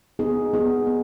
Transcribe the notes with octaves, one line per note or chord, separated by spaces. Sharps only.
B3 D#4 G#4
B3 D#4 G#4
B3